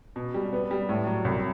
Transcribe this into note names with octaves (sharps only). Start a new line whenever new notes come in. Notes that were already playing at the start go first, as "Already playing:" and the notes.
B2
G3
B3
G3
A2
F#3
C2